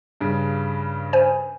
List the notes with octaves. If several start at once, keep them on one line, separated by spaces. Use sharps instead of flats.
G2 C#3
C5 G#5